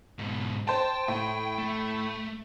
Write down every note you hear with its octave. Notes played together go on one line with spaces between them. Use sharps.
G#2 B2
C5 G5 A5
A2
A3